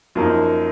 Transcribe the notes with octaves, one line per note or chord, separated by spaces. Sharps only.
F#2 F3 A#3 D#4